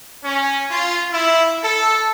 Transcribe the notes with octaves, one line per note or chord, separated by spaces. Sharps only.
C#4
F4
E4
A4